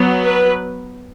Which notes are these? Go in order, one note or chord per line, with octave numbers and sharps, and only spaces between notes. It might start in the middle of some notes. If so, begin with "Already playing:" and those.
Already playing: F#3 B3
B4